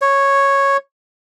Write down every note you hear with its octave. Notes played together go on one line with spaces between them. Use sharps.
C#5